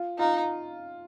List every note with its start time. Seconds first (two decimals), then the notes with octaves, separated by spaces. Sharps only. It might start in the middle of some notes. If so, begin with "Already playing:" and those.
Already playing: F4
0.19 D#4 F4